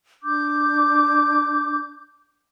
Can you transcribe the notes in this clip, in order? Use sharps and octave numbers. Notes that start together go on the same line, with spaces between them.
D4 D6 G6